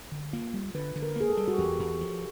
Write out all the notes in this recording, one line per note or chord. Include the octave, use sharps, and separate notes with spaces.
D3
A#3 F4
G3
D3 B4
D3
A#4
A#3 G#4
A4
G3
F#4
E2 G4
E2
F3